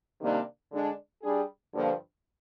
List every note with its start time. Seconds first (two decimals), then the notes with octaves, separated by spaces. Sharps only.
0.21 C3 D#3 G3 A#3 D4
0.71 D3 G#3 D4
1.22 G3 D4 G#4
1.73 G2 D3 F3 A#3